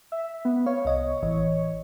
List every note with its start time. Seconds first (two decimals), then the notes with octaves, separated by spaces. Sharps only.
0.12 E5
0.45 B3
0.66 C#5 F5
0.85 C2 D#5
1.23 A1 E3 D#5